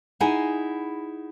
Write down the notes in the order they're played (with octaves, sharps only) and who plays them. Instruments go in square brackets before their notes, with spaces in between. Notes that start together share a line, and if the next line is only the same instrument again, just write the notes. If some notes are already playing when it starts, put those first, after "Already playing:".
[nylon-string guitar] D#4 E4 G#4 F#5 G#5